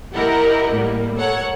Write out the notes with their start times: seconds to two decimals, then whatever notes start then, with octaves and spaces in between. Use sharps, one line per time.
0.15 E4 G4 A#4 D#5 F#5
0.72 A2 G3 A#3
1.16 A4 A#4 C#5 F#5